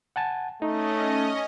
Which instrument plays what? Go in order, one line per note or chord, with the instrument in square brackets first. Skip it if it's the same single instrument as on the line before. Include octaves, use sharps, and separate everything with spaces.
[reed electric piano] F#5 G#5 A5
[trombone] A3 [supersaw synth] C#4 D#5 [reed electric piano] D#4